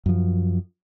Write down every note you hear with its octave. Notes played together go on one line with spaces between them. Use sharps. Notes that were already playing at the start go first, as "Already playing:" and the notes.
F#2 F3